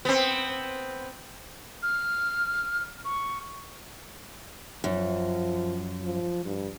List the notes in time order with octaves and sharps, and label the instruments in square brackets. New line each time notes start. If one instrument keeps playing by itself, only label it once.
[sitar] B3 C4
[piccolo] F6
C#6
[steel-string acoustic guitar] F#2 [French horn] F3
[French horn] F3
G2